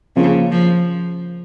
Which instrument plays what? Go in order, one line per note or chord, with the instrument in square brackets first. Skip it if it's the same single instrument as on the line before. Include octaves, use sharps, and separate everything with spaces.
[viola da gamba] C#3 [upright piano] F3 A#3 C#4
[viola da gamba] F3